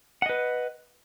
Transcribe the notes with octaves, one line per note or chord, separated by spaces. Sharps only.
B4 D#5 F#5